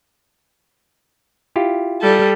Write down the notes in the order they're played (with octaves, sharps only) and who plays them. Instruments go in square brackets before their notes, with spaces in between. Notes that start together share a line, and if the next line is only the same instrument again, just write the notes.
[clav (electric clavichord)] E4 F4 G4
[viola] G3 A4